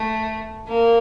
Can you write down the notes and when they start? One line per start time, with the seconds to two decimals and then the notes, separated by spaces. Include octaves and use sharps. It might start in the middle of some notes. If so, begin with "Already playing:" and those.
Already playing: A3
0.67 A#3